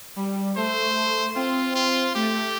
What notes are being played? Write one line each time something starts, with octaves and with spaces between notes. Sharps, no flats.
G3
A3 C5
C4 F4
F4
A3 G4